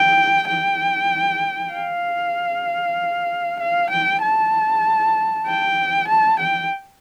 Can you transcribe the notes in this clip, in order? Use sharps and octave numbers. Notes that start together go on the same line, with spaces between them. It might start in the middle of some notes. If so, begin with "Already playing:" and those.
Already playing: G5
G5
F5
F5
G5
A5
G5
A5
G5